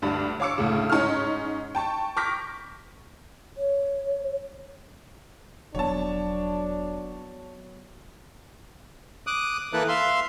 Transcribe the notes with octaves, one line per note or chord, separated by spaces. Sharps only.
D2 G2 D4 B5
C#5 F5 D6 E6 C#7
D2 A2 C#3
G#2 C#4 D#4 C#6 F6
G5 A5 C#6
C#6 D6 F6 G6 A#6 B6
C#5
E1 F#3 B3 D4 C#5 A5
D6 D#6 F#6
E3 A#3 E4 A4 B4 F#6
E5 F5 C6